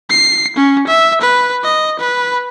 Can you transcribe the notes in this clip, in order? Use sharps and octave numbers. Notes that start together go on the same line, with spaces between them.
C7
C#4
E5
B4
D#5
B4